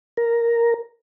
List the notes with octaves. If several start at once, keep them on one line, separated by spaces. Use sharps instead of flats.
A#4